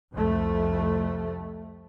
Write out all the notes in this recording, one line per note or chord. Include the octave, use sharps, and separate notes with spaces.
C2 F2 A3